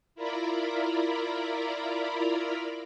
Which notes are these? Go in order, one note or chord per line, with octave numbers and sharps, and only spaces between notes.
E4 F4 A#4 D5 A#5 B5